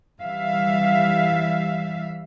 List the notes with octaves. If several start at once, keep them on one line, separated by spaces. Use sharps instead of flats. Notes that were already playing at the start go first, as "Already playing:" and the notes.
E3 G3 E5 F5